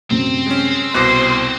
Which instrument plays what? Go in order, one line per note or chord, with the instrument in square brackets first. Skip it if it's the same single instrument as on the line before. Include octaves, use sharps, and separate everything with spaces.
[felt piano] F#2 C3 [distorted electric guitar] C4
[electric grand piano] G#3 C#4
[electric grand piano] C2 B2 D6 [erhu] C5 [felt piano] F#6 A#6 C7